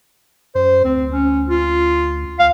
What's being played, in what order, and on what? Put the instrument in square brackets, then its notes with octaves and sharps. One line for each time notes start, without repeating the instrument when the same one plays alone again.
[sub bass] F#2 [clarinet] C5
[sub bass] D2 [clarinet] C4
[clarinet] C#4
F4
[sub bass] C#2 [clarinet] F5